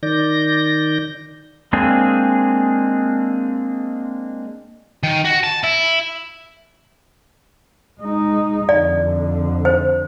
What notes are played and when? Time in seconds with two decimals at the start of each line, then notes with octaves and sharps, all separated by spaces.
0.03 D#3 D5 G6 A#6
1.73 G#3 A#3 C4 D4 G#4
5.03 D#3
5.25 F#4
5.44 A5
5.64 E4
8.01 G#3 D#4
8.69 F2 D3 D5
9.65 C5